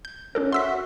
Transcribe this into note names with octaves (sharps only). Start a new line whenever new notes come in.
G6
C#4 D4 A4 A#4
F#4 E5 F#5 C6 E6 B6